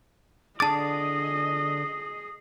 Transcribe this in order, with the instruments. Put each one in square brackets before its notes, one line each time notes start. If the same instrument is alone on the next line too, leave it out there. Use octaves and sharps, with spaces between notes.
[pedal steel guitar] D3 D4 D6 [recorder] G#4 [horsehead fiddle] D#5 [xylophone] A5 A6